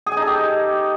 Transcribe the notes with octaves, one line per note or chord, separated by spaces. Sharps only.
G#4
G#5
D#4
A4
G4